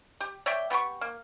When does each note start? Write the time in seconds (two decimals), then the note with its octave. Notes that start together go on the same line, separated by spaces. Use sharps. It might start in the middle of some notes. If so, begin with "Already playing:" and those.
0.20 G4
0.46 C#5 D5 E5 G5
0.70 B3 G4 C6 C#6
1.01 A#3